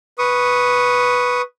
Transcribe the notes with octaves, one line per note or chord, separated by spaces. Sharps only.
B4 C#6 D#6